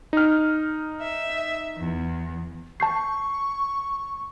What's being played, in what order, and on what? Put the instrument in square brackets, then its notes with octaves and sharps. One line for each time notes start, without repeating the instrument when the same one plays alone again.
[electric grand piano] D#4 F6
[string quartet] E5
E2
[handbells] A5 G6 C7 [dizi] C#6